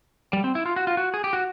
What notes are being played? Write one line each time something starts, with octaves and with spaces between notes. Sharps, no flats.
G3
C4
E4
F4
F#4
F4
F#4
G#4
G4
F#4